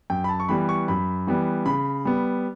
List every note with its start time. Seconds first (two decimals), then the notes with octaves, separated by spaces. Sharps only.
0.10 F#2 G5
0.24 B5
0.29 A5
0.40 C#6
0.49 E3 G3 B3 B5
0.69 C#6
0.88 F#2 B5
1.27 E3 G3 B3
1.66 C#3 B5
2.05 G3 B3